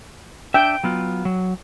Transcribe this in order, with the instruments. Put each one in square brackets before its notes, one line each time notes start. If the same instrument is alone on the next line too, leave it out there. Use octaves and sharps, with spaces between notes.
[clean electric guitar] D4 E5 [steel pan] G5
[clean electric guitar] F#3 B3 F4
F#3